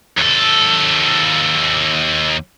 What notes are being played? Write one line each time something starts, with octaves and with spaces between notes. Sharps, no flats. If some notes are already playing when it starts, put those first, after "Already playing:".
D#2 A4